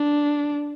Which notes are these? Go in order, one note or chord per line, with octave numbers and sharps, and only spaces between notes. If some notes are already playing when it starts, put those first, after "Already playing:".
Already playing: D4